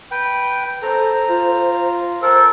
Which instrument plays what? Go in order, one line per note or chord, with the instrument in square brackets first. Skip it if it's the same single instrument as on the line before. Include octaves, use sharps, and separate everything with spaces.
[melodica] B4 G5
[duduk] A4 [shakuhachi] C5 [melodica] A#5
[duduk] F4
[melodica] A4 A#4 [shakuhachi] C5